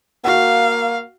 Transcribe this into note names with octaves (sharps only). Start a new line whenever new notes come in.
A#3 F#4 F5 F#5